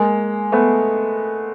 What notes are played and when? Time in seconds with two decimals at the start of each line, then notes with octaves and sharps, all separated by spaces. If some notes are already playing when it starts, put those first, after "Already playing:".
Already playing: G#3 A#3
0.52 A3 B3